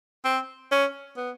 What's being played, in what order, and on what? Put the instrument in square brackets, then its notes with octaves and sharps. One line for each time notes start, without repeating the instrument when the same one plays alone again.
[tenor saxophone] C4
C#4
B3